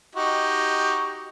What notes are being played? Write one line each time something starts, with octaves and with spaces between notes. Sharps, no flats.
D#4 F#4 G4